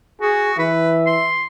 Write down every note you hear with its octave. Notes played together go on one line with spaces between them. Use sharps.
F#4 G#4
E3 B4 E5
C6